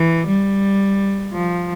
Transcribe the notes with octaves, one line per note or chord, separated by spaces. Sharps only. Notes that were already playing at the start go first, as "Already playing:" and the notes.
Already playing: E3
G3
F3